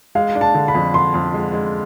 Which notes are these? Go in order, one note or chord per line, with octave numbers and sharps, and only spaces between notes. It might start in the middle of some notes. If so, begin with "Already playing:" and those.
G#3 F5
D4
A5
D3
B5
F2
D3 C6
F2
G#3
G#3